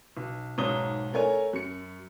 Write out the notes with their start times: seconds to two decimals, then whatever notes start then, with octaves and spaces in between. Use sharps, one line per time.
0.17 B1
0.58 B1 G#2 C#5 A#5 D#6 G7
1.13 A3 A#4 C#5 G#5
1.53 F#2 C#7